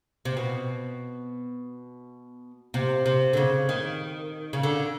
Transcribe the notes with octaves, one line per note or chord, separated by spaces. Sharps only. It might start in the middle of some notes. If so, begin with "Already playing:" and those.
C3
B2
C3
C3
D3
C#3
D#3
C#3
D3